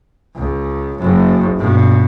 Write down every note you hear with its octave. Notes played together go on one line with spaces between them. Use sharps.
C#2
F#1 F#2
G2 B2